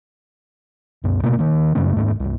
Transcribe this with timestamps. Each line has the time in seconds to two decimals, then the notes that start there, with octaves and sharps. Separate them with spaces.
1.04 C2 F#2
1.23 B2 A3 A#3
1.39 D#3 A#3
1.75 F#2 C#3 A3 C#4
1.96 D#1 G#2 A3
2.20 C2 G2